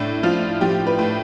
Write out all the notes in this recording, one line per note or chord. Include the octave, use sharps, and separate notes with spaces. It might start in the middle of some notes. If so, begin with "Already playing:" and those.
Already playing: A2 D4
F3 F4
F3 G4
B4
A2